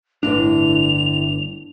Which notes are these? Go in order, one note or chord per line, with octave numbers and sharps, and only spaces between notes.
G1 A2 D3 E3 D4 F7